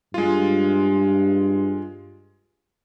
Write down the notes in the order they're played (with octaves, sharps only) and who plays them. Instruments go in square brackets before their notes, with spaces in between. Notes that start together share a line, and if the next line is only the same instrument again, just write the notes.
[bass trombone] G2 [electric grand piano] G#3 F4